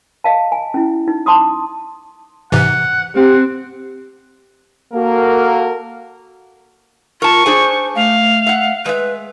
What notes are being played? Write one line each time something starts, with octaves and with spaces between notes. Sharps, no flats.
D#5 F5 A5
G#5
C#4 E4
D#4
A5 C6 D6 D#6
G#2 C3 E3 F#5
C4 G4 F#5
A#3 F#4 A4 A#4
F4 A#4 A5 C#6
D4 G#4 C5 G#5
A3 F5
E5 F#5
G#3 B4 E5